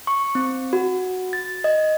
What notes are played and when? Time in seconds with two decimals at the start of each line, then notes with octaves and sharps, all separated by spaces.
0.07 C#6
0.35 C4
0.73 F#4
1.33 A6
1.64 D#5